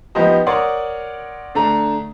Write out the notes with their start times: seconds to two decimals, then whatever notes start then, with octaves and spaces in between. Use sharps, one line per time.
0.15 F3 B3 D#4 G4 C5 D#5
0.46 A#4 C#5 D5 F#5 C6 D#6
1.55 D3 A3 D4 A#5